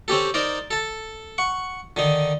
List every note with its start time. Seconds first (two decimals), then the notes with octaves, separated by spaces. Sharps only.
0.08 C4 C#4 G4 A4
0.34 D#4 A#4 C5 D5
0.71 A4 A5
1.38 F#5 C#6
1.96 D3 D#3 D#4